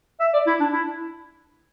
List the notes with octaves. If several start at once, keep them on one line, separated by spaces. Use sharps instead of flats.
E5
D5
E4
D4
E4